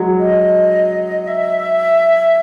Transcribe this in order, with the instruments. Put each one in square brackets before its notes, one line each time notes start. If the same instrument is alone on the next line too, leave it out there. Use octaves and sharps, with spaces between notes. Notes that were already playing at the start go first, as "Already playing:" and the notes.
Already playing: [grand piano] F#3 G#3
[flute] D#5
E5